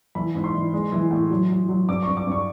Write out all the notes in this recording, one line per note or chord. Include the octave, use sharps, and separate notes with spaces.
E3 B5
G#2
C6
E3
G#3
E3
A2
F#3
F#3
F#3
G2 D6
G2 C#6
D6
G2
C#6